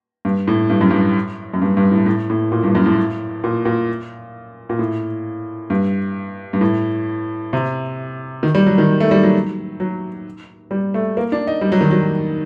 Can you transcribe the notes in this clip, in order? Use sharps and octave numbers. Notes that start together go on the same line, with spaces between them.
G2
A2
G2
F#2
G2
F#2
G2
G2
A2
A2
A2
A#2
G2
F#2
A2
A#2
A#2
A#2
A2
G2
G2
A2
C3
D#3
G3
F#3
D#3
A3
G3
F#3
F#3
G3
A3
A#3
D4
D#4
G3
F#3
D#3
F#3